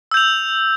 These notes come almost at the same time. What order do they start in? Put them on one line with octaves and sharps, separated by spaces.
E6 G6 F7